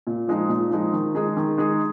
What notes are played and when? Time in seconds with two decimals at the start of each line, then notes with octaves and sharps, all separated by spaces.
0.07 A#2
0.28 F3 G#3 D#4
0.49 A#2
0.71 F3 G#3 D#4
0.93 D#3
1.15 G#3 D#4 G#4
1.37 D#3
1.58 G#3 D#4 G#4